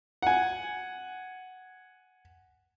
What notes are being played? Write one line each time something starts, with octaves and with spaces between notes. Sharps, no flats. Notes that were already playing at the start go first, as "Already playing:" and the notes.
F#5 G#5